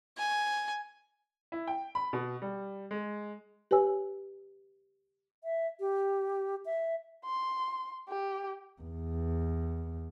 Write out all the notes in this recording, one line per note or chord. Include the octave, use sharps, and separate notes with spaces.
G#5
E4
G5
B5
B2
G3
G#3
G4 B4 C#5 G#5 E6
E5
G4
E5
C6
G4
E2